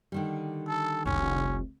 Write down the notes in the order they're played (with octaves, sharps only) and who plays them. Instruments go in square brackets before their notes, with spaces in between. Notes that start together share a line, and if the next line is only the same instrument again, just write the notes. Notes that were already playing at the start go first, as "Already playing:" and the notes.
[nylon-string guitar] D3 D#3 G3
[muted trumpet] A4
[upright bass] F1 C2 [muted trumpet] C#4